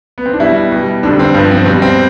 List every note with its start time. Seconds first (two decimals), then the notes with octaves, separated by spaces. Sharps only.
0.18 B3
0.26 C4
0.33 D4
0.40 B2 G3 E4
0.72 B2 G3
1.03 F2 D3 G3 D4
1.19 C4
1.34 G2 F3 B3
1.51 C4
1.66 B2 G3 C4
1.82 C4